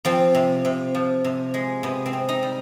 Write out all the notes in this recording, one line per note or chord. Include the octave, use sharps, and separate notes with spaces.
F3 C4
C3
C3
F3
C3
G#3
C3 B3
C4
C3
D#4
G3